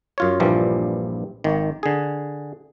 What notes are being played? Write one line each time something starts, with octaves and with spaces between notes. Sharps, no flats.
F#2 F4 C#5
A#1 G2 A#2 E3 F3 G3
G#1 D#3
D3 G#4